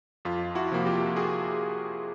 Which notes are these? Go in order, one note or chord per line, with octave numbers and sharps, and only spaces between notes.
F2 F4
E4 F#4
C3 F3 A#3
F4 G4
F#4 G#4